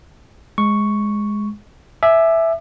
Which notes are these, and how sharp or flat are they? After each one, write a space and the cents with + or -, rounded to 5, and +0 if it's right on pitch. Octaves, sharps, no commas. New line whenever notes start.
G#3 +0 C#6 +0
E5 +0 G#5 +25 D6 +35